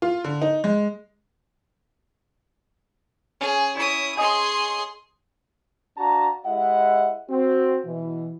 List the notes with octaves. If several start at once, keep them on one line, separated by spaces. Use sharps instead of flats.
F4
D3
D#4
G#3
C#4 G#4
E4 C#5 D#6
G#4 D#5 G#5 C6
D4 F#4 F5 A5 A#5
G#3 E4 G4 D#5 E5 F#5
C4 F#4
B2 E3